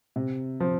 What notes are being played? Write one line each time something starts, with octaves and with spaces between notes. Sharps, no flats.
C3
F3 C4